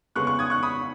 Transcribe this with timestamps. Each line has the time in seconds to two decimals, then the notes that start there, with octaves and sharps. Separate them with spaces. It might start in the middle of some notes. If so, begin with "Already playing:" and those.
0.16 C#3 G#3 B3 C#6 F#6
0.27 C#6 F#6
0.39 D#6 G#6
0.50 C#6 F#6
0.63 B5 D#6